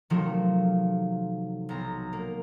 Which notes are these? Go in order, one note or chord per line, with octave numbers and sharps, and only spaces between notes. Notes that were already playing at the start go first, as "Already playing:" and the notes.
C3 D#3 F3 F#3 A3
B1 A#5
A#3